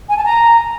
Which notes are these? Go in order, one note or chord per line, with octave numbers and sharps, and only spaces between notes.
G#5
A5
A#5